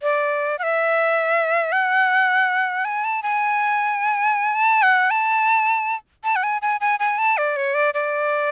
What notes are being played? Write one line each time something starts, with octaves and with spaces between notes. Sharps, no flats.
D5
F#5
E5
F#5
G#5
A5
G#5
A5
F#5
A5
A5
F#5
G#5
G#5
G#5
G#5
A5
D5
C#5
D5
D5